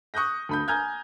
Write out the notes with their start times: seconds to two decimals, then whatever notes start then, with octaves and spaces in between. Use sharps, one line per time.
0.14 C#6 D#6 F#6 G6 A#6
0.49 D2 B5 G6
0.68 G#5 A#5 F6 G6 G#6